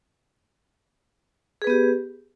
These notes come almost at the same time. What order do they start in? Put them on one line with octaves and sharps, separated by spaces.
G#4 B4 B3 G4